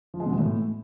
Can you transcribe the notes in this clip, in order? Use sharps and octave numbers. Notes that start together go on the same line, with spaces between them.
F3
G#3
B2
E3
A2